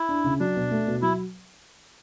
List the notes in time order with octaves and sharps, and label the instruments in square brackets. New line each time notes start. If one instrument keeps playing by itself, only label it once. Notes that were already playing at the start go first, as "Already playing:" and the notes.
Already playing: [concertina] E4
[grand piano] D4
C#3
[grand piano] F#3 [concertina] D4
[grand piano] B2
A3
B2
[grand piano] F#3 [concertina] E4